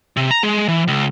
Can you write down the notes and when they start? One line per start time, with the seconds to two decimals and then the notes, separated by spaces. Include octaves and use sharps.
0.17 C3
0.31 A#5
0.43 G#3
0.68 E3
0.88 C#2